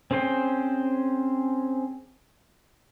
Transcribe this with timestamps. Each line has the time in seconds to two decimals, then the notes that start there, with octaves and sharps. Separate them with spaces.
0.11 C4 C#4 G#4 C5 G5